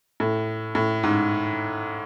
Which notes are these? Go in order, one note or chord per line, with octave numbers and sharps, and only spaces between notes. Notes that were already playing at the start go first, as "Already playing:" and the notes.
A2
A2
G#2